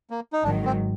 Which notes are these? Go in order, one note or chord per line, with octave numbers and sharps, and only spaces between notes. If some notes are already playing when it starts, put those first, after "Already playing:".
A#3
D#4
G#1 G#2 D#3 F#3 D4
C4